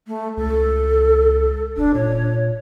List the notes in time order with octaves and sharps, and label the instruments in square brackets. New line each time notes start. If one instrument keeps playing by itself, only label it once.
[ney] A3
[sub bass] C#2 [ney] A4
[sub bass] E1 [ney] D4
[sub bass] A#2 [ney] C#5